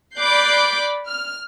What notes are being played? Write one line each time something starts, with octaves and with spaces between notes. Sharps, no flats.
D5 B5 D6 F#6 G6 C7
F6